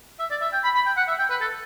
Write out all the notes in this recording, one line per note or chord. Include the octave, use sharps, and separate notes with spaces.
E5
D5
E5
G5
B5
B5
G5
F#5
E5
G5
B4
A4